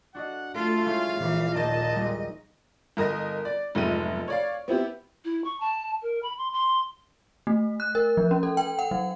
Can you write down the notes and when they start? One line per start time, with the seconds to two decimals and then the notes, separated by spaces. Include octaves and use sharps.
0.15 D4 F#4 D#5 F#5
0.55 A3 F4 A4
0.86 G#3 E4 C#5 F5
1.20 A#1 A#2 E3 D6
1.55 D#2 D#5 A5 G6
1.95 G3 G#3
2.97 G1 A#4 D#5 A#6
3.45 D5
3.75 F1 B1 G#2 E5 D#7
4.28 C#5 D5 F5
4.68 B3 C4 E4 G4
5.25 E4
5.45 C#6
5.60 A5
6.02 A#4
6.23 B5
6.38 C6
6.52 C6
7.47 A3
7.80 F#6
7.95 A#4
8.17 F3
8.31 C#4
8.43 A4
8.57 G5
8.79 F#5
8.91 F#3